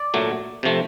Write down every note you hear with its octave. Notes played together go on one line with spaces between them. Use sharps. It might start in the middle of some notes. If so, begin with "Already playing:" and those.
Already playing: D5
A#2 F#3 A3
C3 F3 A3